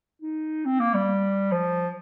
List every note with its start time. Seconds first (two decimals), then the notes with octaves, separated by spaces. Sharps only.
0.22 D#4
0.65 C4
0.80 A#3
0.94 G3
1.52 F3